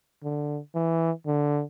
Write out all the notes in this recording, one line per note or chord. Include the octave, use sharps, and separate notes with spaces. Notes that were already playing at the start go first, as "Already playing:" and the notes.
D3
E3
D3